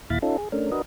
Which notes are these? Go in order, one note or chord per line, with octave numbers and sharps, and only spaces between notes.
D#2 A#2 E4 F5 B5 A6
C#4 D#4 F4 A4
G#4
A3 C#4 D4 A#4
D4 F#4 A#4 B4 D#5